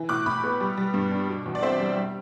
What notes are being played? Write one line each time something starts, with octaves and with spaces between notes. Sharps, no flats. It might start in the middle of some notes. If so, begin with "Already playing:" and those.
Already playing: E3
A2 D6 F#6
A2 B5 D6
B3
G3
G3
G2
D4
B2
E2
D5
C4 C5 E5
G3
G3